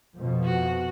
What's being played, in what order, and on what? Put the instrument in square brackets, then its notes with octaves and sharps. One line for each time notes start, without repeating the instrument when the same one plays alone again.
[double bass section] F2 B2 F3
[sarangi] F#4